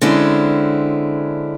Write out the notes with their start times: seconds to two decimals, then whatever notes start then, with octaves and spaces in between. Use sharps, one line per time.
0.01 D3 G#3 C4 C#4 E4